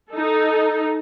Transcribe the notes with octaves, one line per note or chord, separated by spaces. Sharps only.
D#4 A4